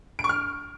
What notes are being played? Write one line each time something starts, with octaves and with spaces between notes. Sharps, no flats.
D7
C#6
F6